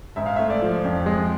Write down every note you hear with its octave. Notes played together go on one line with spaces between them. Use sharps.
G#2 E5
F5
A3 E5
D5
F3
F2
G#3